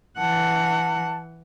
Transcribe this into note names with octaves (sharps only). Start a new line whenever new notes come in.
E3 F#5 A5